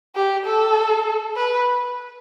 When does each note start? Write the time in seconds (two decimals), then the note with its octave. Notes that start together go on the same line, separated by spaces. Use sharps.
0.16 G4
0.46 A4
1.37 B4